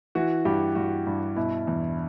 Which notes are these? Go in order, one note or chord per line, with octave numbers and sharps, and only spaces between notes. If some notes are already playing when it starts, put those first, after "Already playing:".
E3 F#4
G2 G4
G2 F#4
G2
B2 E4
E2